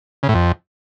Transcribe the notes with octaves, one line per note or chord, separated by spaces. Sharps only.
C#3
A2
F2